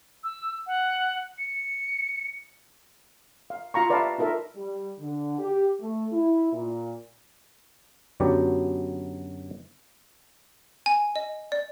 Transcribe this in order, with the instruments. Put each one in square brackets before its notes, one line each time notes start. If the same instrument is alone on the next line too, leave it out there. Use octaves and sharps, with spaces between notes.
[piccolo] E6
F#5
C#7
[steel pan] F5
F4 F5 A#5 C#6
B4 D5 E5 F5 A5 A#5
D#4 F4 A4 A#4 E5
[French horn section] G3
D3
G4
A3
E4
A#2
[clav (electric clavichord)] F#2 D3 F#3 B3 G4 D5
[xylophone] G#5
D#5
D5